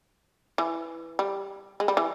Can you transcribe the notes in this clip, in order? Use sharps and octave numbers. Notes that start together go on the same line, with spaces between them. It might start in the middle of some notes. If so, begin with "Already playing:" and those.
E3
G3
G#3
G3
E3